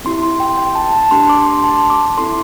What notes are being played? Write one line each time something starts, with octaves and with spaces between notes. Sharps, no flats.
C4 E4 G4 C6
C6
G5
G5
A5
A5
A3 D4 G4 C6
D6
C6
A5
D6
C4 E4 A4 C6